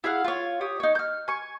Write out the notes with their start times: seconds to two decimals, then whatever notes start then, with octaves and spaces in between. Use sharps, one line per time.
0.04 E4 G#4 F5 F#5
0.24 F4 C#5
0.61 G4 C#5 D#6
0.80 D#4 C#5
0.95 F6 G6
1.28 G#5 C#6